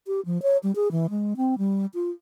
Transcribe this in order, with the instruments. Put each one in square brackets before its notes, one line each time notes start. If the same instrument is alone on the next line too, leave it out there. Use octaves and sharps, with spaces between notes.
[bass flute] G4
F3
C#5
G3
G#4
E3
G#3
C4
G3
F4